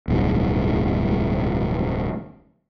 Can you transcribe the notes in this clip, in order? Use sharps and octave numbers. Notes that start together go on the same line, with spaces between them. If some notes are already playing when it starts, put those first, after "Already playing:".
D1 B1 E2 G2